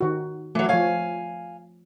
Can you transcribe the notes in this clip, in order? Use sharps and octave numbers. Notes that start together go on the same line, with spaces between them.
D#3 F#4
E3 F#3 A3
F3 C#5 F5 G#5